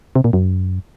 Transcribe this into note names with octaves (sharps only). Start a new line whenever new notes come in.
C3
A#2
F#2